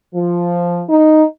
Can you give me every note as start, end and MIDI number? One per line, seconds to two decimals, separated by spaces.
0.14 0.82 53
0.88 1.23 63